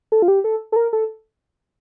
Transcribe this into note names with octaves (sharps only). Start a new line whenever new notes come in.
A4
F4
G4
A4
A4
A#4
A4